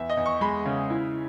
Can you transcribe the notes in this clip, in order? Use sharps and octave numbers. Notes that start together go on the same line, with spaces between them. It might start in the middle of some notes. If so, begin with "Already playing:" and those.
Already playing: E2 E5
D#5
E2
C#6
G#3 B5
C#3
E4